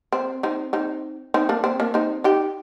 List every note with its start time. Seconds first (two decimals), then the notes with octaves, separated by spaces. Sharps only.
0.12 C4
0.43 C4 D#4
0.73 C4 D#4
1.34 C4 D#4
1.49 A#3 D4
1.64 C4
1.80 A#3 D4
1.94 C4 D#4
2.24 D#4 G4